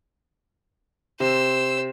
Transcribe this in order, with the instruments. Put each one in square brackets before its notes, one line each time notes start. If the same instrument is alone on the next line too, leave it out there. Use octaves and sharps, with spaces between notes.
[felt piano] C3 [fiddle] C5 E6